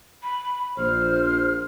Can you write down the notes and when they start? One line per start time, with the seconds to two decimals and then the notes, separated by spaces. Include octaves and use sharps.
0.23 B5
0.78 A#1 C5 F6